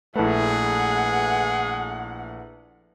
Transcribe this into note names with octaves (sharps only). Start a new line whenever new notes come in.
A#1 A3 E4 G#4 A4 B4 F#5